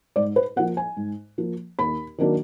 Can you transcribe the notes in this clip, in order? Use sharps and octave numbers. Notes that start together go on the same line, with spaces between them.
G#2 D5
B4
F3 A#3 F#5
G#5
G#2
F3 A#3
D#2 B5
D#3 F#3 A#3 D4